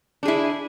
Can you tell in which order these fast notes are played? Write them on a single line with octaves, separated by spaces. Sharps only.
D4 G#4 E4